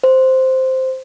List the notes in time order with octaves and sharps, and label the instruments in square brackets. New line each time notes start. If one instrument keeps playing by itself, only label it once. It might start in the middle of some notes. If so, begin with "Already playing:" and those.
[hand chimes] C5